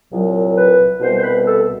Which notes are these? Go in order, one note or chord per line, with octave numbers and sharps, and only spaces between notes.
C2 A#2 F#3
B4
C2 B2 G3 C5
C5
B4
A4